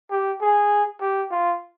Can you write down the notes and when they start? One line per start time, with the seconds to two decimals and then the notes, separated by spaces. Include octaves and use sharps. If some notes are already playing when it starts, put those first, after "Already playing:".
0.11 G4
0.42 G#4
1.01 G4
1.31 F4